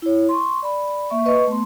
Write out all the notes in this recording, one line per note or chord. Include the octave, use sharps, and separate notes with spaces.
E4 C#5
C6 C#6
D5 B5
A#3 E5 C#6
B4 D#5 C#6
A3 B3 C6